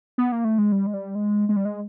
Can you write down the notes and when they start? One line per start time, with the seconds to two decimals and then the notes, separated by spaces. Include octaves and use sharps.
0.18 B3
0.32 A#3
0.45 A3
0.58 G#3
0.72 G3
0.86 G#3
0.94 G3
1.15 G#3
1.49 G#3
1.56 G3
1.65 G#3